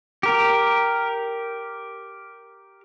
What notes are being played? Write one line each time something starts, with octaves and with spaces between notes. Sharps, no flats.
G4 A#4